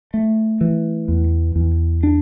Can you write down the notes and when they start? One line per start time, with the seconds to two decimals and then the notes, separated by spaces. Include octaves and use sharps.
0.14 A3
0.61 E3
1.08 E2
1.56 E2
2.03 D4